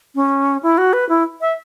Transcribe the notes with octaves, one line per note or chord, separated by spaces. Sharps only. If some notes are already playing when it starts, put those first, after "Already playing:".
C#4
E4
F#4
B4
E4
E5